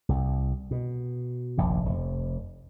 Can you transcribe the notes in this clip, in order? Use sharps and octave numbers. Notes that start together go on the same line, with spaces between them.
C2
B2
F1 A#1 D#2
F1